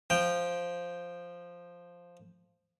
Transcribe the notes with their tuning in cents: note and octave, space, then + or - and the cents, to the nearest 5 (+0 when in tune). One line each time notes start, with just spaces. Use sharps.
F3 +0 G5 +0